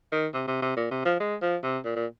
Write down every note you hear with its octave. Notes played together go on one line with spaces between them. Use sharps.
D#3
C3
C3
C3
A#2
C3
F3
G#3
F3
C3
A#2
A#2